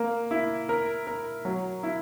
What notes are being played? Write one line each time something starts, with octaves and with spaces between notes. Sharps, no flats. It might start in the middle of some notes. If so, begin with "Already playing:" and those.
Already playing: A#3
E4
A#4
A#4
F#3
E4